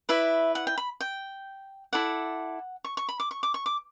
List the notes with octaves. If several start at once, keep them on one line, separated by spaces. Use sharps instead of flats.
E4 B4 D5 E5
F#5
G5
B5
G5
E4 A4 D5 F#5
C#6
C#6
B5
D6
C#6
D6
C#6
D6